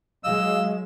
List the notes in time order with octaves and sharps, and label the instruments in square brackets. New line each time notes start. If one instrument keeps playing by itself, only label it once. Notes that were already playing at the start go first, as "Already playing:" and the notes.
[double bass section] F#3 G#3 [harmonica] D#5 E6 [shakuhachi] F5